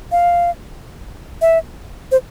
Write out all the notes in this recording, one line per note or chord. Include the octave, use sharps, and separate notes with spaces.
F5
E5
C5